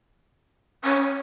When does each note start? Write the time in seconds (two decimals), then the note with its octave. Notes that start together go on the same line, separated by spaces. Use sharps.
0.83 C#4